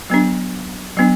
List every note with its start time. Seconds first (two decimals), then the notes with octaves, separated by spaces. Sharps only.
0.10 F#3 B3 D4
0.97 F#3 B3 D4